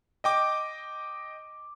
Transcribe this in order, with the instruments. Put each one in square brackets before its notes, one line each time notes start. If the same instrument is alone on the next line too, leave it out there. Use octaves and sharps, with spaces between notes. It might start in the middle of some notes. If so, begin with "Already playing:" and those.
[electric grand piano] D#5 G5 D6